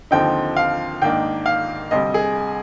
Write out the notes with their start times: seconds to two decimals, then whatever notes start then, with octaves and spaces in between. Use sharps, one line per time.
0.11 D#2 D3 F3 C4 D#4 G5
0.56 F5
1.02 G#2 D#3 A#3 D4 G5
1.46 F5
1.91 D2 C3 G3 D#5
2.14 G#4